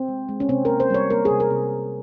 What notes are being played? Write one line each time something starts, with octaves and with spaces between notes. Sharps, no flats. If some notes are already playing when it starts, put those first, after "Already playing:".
Already playing: C4
G#3
G#3
C#4
C3 C4
A#3 A#4
C5
G3 C#5
A#3 A#4
G#4
C3
A#4
C3